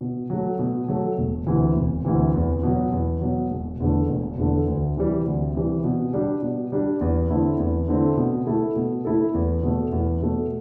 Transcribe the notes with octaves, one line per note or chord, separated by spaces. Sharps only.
B2
F#3 A3
B2
F#3 A3
E1
D2 C3 E3
E1
D2 C3 E3
E2
B2 F#3
E2
B2 F#3
E1
E2 D3 A3
E1
E2 D3 A3
D2
C3 E3 G3
D2
C3 E3 G3
B2
G3 D4 G4
B2
G3 D4 G4
E2
D3 A3 C4 E4
E2
D3 A3 C4 E4
B2
A3 E4 A4
B2
A3 E4 A4
E2
B2 A3
E2
B2 A3